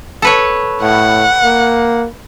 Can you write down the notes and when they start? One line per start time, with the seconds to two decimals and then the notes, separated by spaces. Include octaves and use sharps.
0.22 A4 B4 C#5
0.82 A2 F#5
1.44 A#3